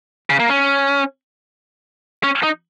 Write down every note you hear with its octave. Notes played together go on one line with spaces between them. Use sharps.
C#3
A#3
C#4
C#4
D#4